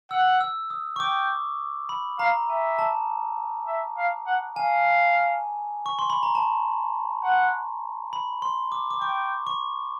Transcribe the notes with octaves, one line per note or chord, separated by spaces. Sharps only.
F#5 E6
E6
D#6
C#6
G5 D6
B5
F5 A#5
E5 G#5
A5
E5
F5
F#5
F5 G#5
C#6
C6
B5
A#5
A5
F#5
B5
C6
D6
D6
G5 C#6
C#6